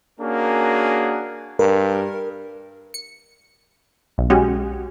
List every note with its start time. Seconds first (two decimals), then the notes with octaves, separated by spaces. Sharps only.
0.20 A#3 C#4 D4 F#4 G#4 A#4
1.59 G2 A#4
2.94 C#7
4.18 B1
4.30 G#3 C#4 F#4 G4